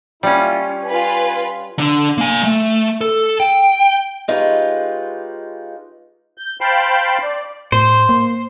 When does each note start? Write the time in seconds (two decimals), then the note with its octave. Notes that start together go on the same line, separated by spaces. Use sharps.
0.23 G3 A#3 C#4 E4 F4
0.86 F4 B4 G#5
1.78 D3 D4
2.18 A#3 G#5
2.44 A3
3.01 A4
3.40 G5
4.28 G#3 D#4 F4 G4 B4 C#5
6.38 G6
6.61 C5 F5 G5 A5 B5 C6
7.23 D5
7.72 A2 C5
8.09 A#3